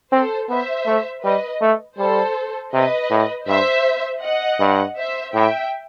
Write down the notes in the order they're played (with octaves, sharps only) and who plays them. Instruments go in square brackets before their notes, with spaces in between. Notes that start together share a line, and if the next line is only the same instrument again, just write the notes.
[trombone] C4 [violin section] A4 C5
[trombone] B3 [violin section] C5 E5
[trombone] A3
[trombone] G3 [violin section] B4 D#5
[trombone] A3
[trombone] G3 [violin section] A4 C5
[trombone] C3 [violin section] B4 D#5
[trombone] A2
[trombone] G2 [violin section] C5 E5
[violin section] D#5 F#5
[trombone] G2
[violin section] C5 E5
[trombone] A2 [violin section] E5 G5